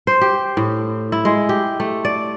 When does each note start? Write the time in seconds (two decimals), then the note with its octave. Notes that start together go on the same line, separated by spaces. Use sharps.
0.07 C5
0.21 G4
0.57 A2
1.12 E4
1.25 G#3
1.49 G4
1.80 A3
2.05 D5